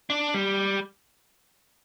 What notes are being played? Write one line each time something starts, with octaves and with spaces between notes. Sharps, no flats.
D4
G3